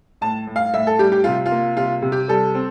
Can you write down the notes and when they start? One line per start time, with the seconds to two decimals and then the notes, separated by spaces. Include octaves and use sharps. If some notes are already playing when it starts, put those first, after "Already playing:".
0.21 A2 A5
0.47 A2
0.56 F5
0.74 A2 E5
0.87 A4
0.99 G3 G4
1.12 G4
1.24 C3 F4
1.46 F4
1.52 A#3
1.77 C3 F4
2.02 C3
2.12 G4
2.28 G3 A4
2.55 C4